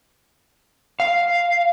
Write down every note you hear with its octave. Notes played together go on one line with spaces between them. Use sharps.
F5